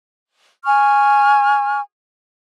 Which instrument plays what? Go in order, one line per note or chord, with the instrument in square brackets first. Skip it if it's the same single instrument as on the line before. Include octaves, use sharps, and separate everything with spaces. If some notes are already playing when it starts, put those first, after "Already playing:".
[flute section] G#5 C#6 F6